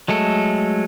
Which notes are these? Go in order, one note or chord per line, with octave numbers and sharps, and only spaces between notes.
F#3 G#3 A3 A4